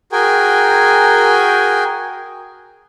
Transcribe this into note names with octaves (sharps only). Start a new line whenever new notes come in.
F#4 G#4 A#4 G5 G#5